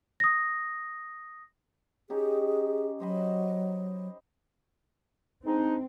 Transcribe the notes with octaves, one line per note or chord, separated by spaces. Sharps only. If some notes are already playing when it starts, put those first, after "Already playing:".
D#6 A#6
C#4 D#4 G4 G#4
F#3 C5 D#5 B5
G#3 C4 D4 D#4